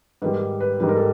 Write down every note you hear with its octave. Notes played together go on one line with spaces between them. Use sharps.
G#2 D#3 G3 B4
B4
G#2 D#3 G3 B4
A#4
A4